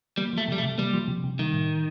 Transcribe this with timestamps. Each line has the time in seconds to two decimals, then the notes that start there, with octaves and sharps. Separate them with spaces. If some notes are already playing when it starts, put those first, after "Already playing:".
0.17 G3 A#3
0.33 F3 A3
0.48 C3 G3
0.58 A3
0.64 C3
0.78 G3 A#3
0.93 F3
1.08 C3
1.24 C3
1.39 D#3 G3
1.54 A2